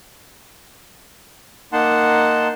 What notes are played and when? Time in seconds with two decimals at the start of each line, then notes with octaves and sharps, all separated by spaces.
1.73 A#3 D#4 F#5 A5 C6